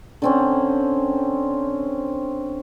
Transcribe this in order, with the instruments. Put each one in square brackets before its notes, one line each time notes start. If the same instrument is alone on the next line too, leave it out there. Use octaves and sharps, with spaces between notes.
[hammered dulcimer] D3 C4 C#4